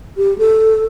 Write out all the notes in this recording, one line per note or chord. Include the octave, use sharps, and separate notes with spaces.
G4
A4